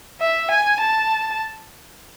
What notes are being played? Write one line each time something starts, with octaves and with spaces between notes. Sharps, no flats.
E5
G#5
A5